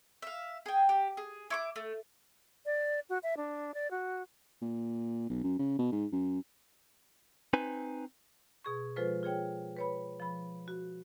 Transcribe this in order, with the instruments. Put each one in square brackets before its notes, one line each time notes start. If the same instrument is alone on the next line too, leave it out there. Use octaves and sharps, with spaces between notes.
[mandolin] E5 F5
G#4 G5
G4
G#4
E4 C#6 D6
A3
[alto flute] D5
F#4
E5
D4
D5
F#4
[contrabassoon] A#2
B1
F#2
C#3
B2
G#2
F#2
[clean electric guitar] C4 D#4 B4 G#5
[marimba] B2 G#4 C#6
F3 G#3 F4 A4 B4 C5
F4 G#4 C#5 G5
B4 C#5 B5
F3 B5
F#4